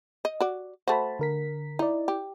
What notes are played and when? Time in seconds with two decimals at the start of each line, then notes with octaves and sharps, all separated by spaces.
0.25 D#5
0.40 F#4 D5
0.88 A3 F#4 C5 A5 B5
1.19 D3 A#4 B6
1.79 D#4 E4 D5
2.08 G4